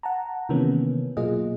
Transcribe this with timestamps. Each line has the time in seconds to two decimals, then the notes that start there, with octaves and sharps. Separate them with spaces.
0.03 F#5 A5 A#5
0.49 C3 D#3 E3 A#3 B3 C#4
1.17 B2 F#3 A#3 F4 G#4 D#5